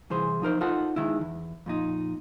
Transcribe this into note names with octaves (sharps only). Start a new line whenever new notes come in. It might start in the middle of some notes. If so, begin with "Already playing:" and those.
C2 E3 G#4 C5
F3 D#4 A#4 C5
D#4 F4 A4 C5 F#5 A5
D#3 G#3 E4
E2
F2 A#2 D#4